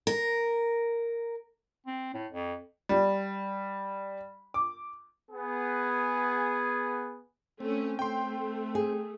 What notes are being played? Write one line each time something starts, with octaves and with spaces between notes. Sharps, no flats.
A#4
C4
A2
F2
G3
D6
B3 G#4
A3 C4 C#4
A3 G5 C6
G#4